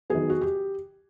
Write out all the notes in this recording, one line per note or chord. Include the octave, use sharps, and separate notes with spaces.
D#3 F#3 B3 G#4
F#4
G4